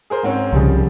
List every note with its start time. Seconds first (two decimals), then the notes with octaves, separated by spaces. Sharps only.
0.10 G#4 A#4 C5
0.23 G#2 C4 C#4
0.53 C2 C#3 F3 G3